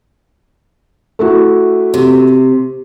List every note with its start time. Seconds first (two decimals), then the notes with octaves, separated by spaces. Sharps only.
1.19 A3 E4 F#4
1.94 C3